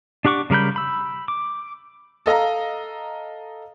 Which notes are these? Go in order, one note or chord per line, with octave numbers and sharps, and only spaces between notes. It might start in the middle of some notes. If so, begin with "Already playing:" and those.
D4 G4 F#5 C#6 D6
C#3 G3 A#4 B5 G6
B5 E6
D6
A4 D#5 F5 A#5